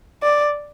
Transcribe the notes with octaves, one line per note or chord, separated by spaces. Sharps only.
D5